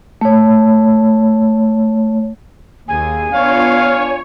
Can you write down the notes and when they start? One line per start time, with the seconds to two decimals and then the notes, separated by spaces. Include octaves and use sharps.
0.21 A3 C#5
2.88 D#2 G#4 G#5
3.33 B3 D4 F4 C#5 F5